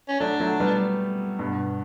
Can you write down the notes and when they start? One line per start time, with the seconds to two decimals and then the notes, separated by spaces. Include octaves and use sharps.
0.08 C#4
0.20 F#3 A3 D4
0.40 F#3 A3
0.60 G3 B3
1.39 G2 B2